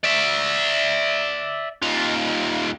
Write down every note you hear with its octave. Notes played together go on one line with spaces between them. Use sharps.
D5 E5
D#2 F4